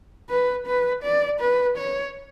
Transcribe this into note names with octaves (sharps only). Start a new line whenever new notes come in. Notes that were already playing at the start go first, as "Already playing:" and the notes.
B4
B4
D5
B4
C#5